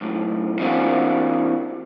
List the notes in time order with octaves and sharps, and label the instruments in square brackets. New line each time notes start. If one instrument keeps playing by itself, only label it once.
[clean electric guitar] B1 F#2 A2
E3 A#3 C4 D4 F4 F#4